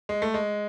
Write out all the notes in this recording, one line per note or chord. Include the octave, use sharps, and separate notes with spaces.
G#3
A3
G#3